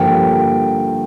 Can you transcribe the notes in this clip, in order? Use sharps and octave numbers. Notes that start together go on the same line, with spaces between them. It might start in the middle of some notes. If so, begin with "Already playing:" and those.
Already playing: G2 D3 F3 A#3 G5